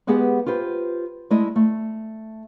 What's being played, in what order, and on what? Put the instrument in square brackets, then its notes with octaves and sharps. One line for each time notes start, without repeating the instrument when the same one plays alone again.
[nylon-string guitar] G#3 B3 G4 G#4 B4 F#5
F4 G4 B4 C5
G#3 A3 E4 D5 D#5
A3